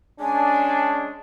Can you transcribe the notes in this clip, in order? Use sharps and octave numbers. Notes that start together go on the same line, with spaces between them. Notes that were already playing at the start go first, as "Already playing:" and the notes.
G#3 C#4 D4 G#5